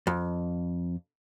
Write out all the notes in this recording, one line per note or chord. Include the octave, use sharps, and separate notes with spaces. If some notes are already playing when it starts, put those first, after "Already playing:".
F2